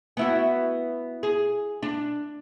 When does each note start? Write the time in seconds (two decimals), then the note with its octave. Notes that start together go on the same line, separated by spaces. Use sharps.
0.17 B3 E4 F#4
1.23 G#4
1.83 D4